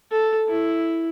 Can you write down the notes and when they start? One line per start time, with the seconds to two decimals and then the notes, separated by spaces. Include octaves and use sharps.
0.11 A4
0.48 E4